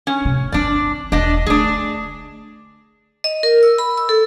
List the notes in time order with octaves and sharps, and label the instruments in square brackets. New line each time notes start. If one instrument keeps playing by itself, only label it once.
[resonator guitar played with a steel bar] C#4
[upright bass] A2 C3
[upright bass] G1 C4 [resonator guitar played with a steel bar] D4 D5
[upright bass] E1 C4 [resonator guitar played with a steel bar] D4 D#5
[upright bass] D3 A3 [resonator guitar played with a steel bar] D4 G#4
[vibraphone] D#5
A#4
E6
B5
E6
A4